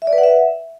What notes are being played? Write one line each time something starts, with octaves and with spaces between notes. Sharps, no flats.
E5
D5
B4
F#5
E5